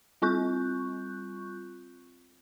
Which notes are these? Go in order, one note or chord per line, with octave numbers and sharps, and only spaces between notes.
G3 C4 F4 C#6 F#6 G6